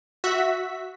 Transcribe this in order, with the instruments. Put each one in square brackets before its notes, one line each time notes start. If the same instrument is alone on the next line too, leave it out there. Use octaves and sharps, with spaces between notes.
[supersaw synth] F#4 E5 B6